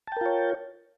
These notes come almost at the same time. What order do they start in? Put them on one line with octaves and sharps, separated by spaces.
A5 G5 A#4 F4 C#5